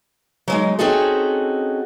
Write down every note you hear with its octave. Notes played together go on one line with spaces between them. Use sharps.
F#3 G#3 D#4
C4 C#4 D#4 F#4 G#4 A4